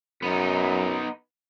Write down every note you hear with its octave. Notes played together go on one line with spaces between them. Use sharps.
F#2 B3 D#4